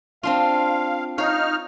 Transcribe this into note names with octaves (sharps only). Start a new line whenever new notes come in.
C4 D4 F4 F5
D#4 C#5 F5 F6